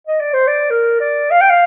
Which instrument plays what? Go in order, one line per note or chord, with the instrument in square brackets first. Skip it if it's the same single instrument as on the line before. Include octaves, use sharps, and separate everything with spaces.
[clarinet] D#5
D5
C5
D5
A#4
D5
F5
G5
F5